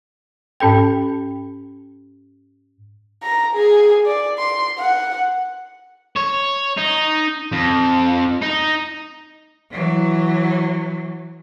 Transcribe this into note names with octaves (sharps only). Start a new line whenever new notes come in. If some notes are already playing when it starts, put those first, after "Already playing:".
G#2 C#4 A4 G5
A#5
G#4
D5
C6
F#5
C#5
D#4
F2
D#4
E3 F#3